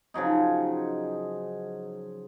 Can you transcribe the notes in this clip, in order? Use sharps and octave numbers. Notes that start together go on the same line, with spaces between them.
C#3 F3 F#3 D#4